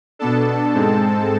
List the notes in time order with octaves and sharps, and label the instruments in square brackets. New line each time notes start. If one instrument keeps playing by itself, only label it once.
[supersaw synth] B2 B3 D4 A4 A5
G#2 G#3 C4